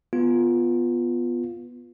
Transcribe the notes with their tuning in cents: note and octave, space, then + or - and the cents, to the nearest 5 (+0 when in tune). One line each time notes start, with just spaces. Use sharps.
B3 +0 F4 +0